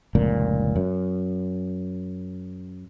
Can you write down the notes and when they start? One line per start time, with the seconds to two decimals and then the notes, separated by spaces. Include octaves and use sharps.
0.15 F1 C#2 A#2
0.76 F#2